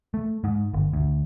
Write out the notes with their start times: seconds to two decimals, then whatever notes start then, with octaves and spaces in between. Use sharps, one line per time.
0.14 A3
0.44 G#2
0.74 G1
0.93 D2